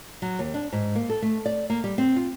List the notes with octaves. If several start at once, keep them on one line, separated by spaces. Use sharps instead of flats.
F#3
D#2
D4
G#2
A#3
A4
A3
D5
A#3
G3
C4
F4